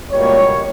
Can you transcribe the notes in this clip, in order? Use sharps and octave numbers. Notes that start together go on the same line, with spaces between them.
C#2 B2 G3 A#3 C#5